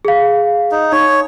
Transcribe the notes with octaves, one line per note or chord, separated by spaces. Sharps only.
G#4 F5
D#4
D#4 C#5